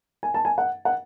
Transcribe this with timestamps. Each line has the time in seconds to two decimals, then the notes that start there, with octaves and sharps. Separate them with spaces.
0.23 G#5
0.34 A5
0.45 G#5
0.58 F#5
0.85 F#5